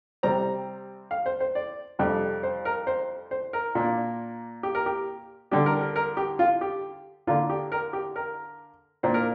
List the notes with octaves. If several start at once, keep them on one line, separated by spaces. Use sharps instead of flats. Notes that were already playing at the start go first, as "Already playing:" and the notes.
C3 G3 C4 A#5
F5
C5
C5
D5
F2 C3 G3 D4
C5
A#4
C5
C5
A#4
A#2 A#3 D4
G4
A#4
G4
D3 G3 D4 G4
A#4
A#4
A#4
G4
F4
G4
D3 A#3 D4 F4
G4
A#4
G4
A#4
A#2 A#3 D4 C5
A#4